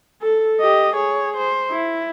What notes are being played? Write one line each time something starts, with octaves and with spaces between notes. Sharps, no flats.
A4
G4 D#5
G#4 C#5
C5
E4